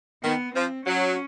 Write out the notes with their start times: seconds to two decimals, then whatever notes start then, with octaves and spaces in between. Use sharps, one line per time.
0.23 D#3 B3
0.55 F3 C4
0.86 F#3 C#4